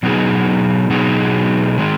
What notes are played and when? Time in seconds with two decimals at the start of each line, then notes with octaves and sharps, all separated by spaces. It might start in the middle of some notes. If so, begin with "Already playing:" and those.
0.03 B2 F#3 B3 D#4 G#4
0.90 B2 F#3 B3 D#4 G#4
1.79 D#3 G#3